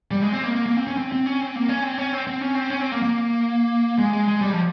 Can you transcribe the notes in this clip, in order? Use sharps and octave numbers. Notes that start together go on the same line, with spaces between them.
G3
G#3
C4
A#3
A#3
A#3
C4
C#4
C4
C4
C#4
C4
A#3
C#4
C4
C#4
C4
C4
C#4
C4
C#4
C4
A#3
A#3
G#3
G#3
G#3
G3
F3